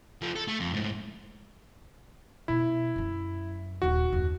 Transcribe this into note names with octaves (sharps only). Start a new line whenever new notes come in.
F3 A3
A4
A3
F2
G#2 A3
B2 E4
F#2 F#3
D#1 D#4 F#4
F#1 D#2